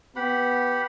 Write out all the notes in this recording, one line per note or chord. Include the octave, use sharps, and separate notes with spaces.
B3 G4 F#5 B5